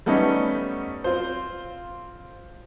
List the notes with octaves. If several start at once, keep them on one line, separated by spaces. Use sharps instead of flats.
G3 A3 B3 C#4 D#4
C4 F4 C5